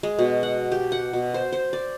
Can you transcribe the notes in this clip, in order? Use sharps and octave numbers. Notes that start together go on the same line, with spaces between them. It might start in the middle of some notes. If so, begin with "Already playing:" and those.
G#3
B2
F#5
G4
F#5
B2
C5
C5
D5